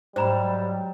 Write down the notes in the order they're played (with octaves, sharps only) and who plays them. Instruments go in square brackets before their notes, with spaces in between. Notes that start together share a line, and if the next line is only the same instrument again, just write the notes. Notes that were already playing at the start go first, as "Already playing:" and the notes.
[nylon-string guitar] G#2 [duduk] F#3 [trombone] G3 [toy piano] C5 A#5 B5